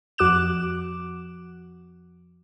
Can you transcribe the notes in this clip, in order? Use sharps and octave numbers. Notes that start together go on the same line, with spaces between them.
F2 F#4 D6 F#6 E7